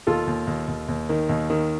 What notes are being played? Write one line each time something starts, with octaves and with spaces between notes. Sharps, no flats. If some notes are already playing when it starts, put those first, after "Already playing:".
D#2 F4 A4
D#2
D#2
D#2
D#2
D#3
D#2
D#3